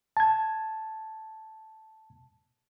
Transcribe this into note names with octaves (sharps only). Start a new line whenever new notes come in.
A5 G#6